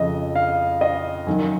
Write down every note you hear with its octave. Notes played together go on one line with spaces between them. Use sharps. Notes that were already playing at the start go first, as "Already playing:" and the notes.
Already playing: F2 C#3 D#5
F5
D#5
F#2 D#3